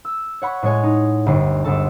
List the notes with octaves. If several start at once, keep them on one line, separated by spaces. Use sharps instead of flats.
E6
C#5 F#5 B5 C#6
A2 G#3 C#5 G#5
D#4
G1 D2 A#5 C7
G1 G#3 A4 A5